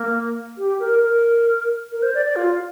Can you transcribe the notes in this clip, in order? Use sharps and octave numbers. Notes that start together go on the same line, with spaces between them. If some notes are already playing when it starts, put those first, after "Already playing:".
Already playing: A#3
G4
A#4
A#4
A#4
C5
D5
D5
F4